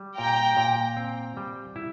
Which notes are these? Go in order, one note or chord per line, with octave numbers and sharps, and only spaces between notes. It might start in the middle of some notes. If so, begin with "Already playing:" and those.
Already playing: G3
A#2 G5 A#5
A#2
C4
G3
E4